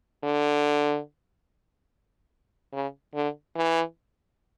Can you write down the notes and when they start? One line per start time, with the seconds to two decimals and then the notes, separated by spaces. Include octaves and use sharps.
0.24 D3
2.73 C#3
3.15 D3
3.56 E3